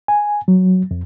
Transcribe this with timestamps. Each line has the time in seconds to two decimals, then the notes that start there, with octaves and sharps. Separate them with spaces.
0.08 G#5
0.48 F#3
0.91 F2